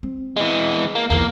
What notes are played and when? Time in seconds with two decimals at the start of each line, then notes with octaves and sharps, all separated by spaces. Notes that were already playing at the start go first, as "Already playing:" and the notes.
0.03 C4
0.36 E3 G#3
0.95 A#3
1.10 B1 E2 A#3